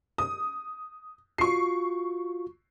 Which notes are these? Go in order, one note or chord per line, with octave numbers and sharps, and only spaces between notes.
D#6
F4 F#4 C#6 C7